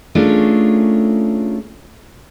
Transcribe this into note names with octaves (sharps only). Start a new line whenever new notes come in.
A3 C#4 D4 F4 G#4 A#4